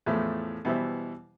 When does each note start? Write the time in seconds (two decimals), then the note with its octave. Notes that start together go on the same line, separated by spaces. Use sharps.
0.06 E2 A2 F3 A3
0.65 B2 E3 G3 C5 E5